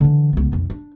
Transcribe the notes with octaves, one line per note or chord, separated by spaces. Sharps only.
D3 E3
C#2 B3
B1 F2
D4